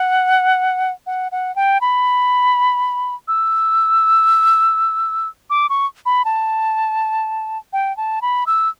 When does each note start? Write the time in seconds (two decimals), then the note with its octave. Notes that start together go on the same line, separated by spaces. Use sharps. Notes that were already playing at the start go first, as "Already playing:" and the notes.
Already playing: F#5
1.07 F#5
1.32 F#5
1.56 G5
1.81 B5
3.28 E6
5.50 D6
5.70 C#6
6.06 B5
6.25 A5
7.73 G5
7.97 A5
8.22 B5
8.47 E6